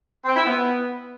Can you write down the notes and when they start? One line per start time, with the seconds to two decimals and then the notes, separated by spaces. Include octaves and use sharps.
0.24 C4
0.35 E4
0.47 B3